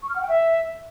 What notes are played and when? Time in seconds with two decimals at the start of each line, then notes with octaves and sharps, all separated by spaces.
0.03 C#6
0.09 F6
0.16 F#5
0.22 G5
0.29 E5